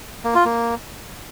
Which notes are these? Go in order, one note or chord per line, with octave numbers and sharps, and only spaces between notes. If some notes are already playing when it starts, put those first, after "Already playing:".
A#3
F4
A#3